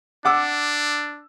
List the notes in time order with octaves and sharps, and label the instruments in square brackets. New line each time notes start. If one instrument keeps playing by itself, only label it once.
[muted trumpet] D4 [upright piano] F#5 D6 E6